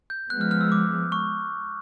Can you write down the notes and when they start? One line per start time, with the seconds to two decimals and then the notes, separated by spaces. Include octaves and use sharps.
0.10 G6
0.30 F3 G#3 B3 F#6
0.41 F6
0.51 F6
0.61 E6
0.72 D6
1.12 C#6